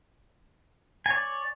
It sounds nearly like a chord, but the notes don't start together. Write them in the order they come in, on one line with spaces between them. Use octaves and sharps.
G#5 C#5 D5